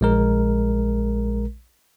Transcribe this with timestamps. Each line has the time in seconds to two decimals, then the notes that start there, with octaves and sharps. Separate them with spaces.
0.01 A#1 G#3 A#4